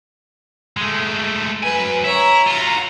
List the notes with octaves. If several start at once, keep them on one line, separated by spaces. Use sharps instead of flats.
G#3 A3
F#2 B4 G#5
E4 C#5 A#5
F4 F#4 A#5